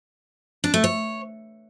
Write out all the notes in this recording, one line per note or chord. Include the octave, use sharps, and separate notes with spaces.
D4
A3
C#5